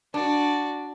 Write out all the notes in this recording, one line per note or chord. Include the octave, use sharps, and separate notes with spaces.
D4 F#4 D5